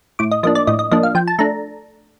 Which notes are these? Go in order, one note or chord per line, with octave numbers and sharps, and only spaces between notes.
A2 D6
D#5
F3 A#3 D4 D#5
D5
A2 D#5
D#5
F3 A#3 D4 D#5
F5
F3 G5
A5
A3 D4 A#5